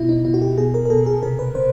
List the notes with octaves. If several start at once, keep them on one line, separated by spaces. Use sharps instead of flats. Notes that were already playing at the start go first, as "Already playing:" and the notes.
Already playing: B2 E4
D#4
B2 E4
F#4
G4
B2 G#4
A#4
A#4
B2 A4
G#4
C3 A#4
B4
C3 C5